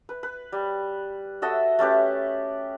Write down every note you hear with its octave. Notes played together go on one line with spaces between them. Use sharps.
B4
B4
G3
F#4 A4 D#5 E5
A3 C#4 G4 B4